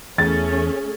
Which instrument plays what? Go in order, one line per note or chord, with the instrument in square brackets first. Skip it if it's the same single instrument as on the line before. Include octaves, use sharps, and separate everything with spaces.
[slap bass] E2 E3 [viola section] A3 C#4 [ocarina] G#4 [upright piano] A6